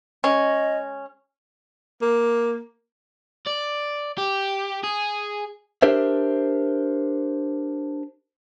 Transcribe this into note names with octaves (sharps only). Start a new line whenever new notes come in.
G#3 C#4 D#5
A#3
D5
G4
G#4
D4 G4 A#4 C5 E5